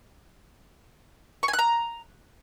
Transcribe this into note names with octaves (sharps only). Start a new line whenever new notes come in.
C#6
G#5
F#6
A#5